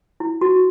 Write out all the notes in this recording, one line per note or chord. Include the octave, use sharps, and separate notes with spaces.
E4
F#4